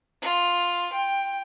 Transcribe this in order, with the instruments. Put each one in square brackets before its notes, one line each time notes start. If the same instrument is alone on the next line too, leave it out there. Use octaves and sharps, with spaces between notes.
[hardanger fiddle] F4
G5